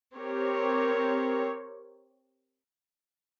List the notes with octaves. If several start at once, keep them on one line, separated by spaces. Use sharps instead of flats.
C4 G4 A#4 C#5